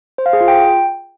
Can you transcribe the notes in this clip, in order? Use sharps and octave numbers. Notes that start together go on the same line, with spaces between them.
C5
F5
G#4
F4
G5